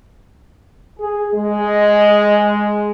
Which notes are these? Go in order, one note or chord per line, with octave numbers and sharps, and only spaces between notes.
G#4
G#3